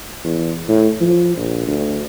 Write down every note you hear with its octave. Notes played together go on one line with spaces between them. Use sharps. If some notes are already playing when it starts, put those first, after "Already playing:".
E2
A2
F3
A#1
D2